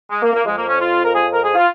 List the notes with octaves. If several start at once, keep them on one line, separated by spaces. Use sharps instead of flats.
G#3
A#3
A#3
F3 G#3
F2
A#3
C#4
F4
A#4
G#4
A#4
G#4
F4